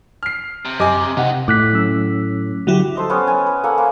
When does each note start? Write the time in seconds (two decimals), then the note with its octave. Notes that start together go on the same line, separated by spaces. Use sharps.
0.23 F6 C7
0.65 C3
0.80 F#2 G4 D#5 G#5 D6
1.17 C3 D#4 G4 F#5
1.48 A2 D6 F#6 B6
1.73 F#3 C#4 E6
2.67 D3 F#3 E4 F#4 G4
2.95 A4 C5 D#5
3.10 B3 C#4 G5
3.27 G#5
3.46 B4
3.64 A#3 A4 F#5 G#5
3.78 A#3 C5